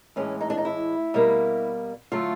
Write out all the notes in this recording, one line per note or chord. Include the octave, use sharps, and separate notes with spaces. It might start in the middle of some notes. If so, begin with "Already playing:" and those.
A2 E3 G#3 C#4
D#4
D4
D#4
E4
B2 G3 A#3
D3 F#3 A3 F4